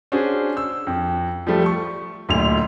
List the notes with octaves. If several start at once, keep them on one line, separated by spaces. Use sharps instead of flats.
C#4 D4 F#4 G#4 C5
E6
F2
F3 G3 A3
C#6
D1 D2 A#2 F7